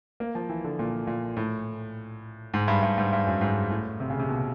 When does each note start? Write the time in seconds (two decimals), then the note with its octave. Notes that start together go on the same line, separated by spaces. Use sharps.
0.20 A#3
0.35 F3
0.49 E3
0.64 D3
0.79 A#2
1.07 A#2
1.37 A2
2.54 G#2
2.68 G2
2.83 G2
2.98 G#2
3.13 G2
3.27 F#2
3.41 G#2
3.71 A2
4.00 C3
4.10 C#3
4.19 C3
4.29 B2